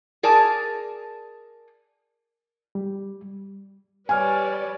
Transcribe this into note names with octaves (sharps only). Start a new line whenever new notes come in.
G#4 A#4 D5 G#5 A5
G3
G3 B4 C#5 D5 G#5 F6